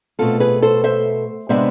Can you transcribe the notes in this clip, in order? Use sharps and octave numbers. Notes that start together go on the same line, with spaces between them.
B2 A3 C4 F4 A4
G#4 B4
A4 C5
C5 E5
C3 G#3 B3 D4 C5 E5